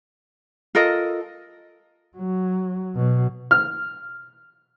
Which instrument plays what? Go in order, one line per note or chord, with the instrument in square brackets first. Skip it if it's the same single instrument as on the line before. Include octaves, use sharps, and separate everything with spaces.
[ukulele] F4 A4 A#4 D#5
[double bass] F#3
B2 F#3
[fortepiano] F6